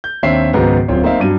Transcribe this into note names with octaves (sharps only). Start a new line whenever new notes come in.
G6
D#2 C4 D4 C#5 E5 C7
C#2 G#2 D#3 F#3 B3
D1 C4 F4 C#5
A#3 C4 D#4 E5 F5
G2 F#3 D#7